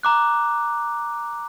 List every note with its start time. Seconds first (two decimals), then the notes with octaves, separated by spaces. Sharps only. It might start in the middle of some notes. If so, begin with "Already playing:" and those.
0.03 A#5 D6 F#6